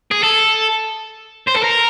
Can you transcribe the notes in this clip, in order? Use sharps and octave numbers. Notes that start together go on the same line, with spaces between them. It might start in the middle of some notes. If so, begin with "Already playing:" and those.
G#4
A4
C5
A4
A#4